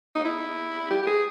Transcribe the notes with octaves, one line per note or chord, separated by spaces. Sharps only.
D#4
E4
G4
G4
G#4